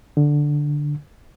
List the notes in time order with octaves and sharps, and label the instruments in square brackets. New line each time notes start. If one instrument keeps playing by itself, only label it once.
[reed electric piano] D3